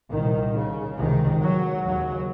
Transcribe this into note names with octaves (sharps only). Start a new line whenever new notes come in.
C2 A#2 D#3
C#3
C#2 C3 D#3
F#3
D#2 C#3 F#3